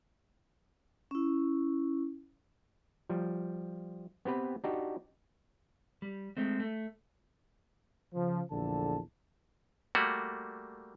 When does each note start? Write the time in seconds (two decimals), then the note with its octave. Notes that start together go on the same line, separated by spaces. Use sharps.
1.11 C#4 E4
3.10 F3 G3
4.25 B3 C4 G4 B4
4.64 D4 D#4 F#4 G4
6.02 G3
6.37 G#3 A3 C4
6.60 A3
8.14 C#3 F3
8.52 A#1 E2 D3 A4 A5
9.95 G3 A3 A#3 F#4